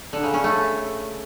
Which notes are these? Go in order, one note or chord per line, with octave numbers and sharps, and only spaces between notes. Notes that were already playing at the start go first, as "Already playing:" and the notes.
D3
C#3
C#4
A3